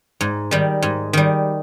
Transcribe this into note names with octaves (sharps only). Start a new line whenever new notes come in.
G#2
D#3 G3
G#2
D#3 G3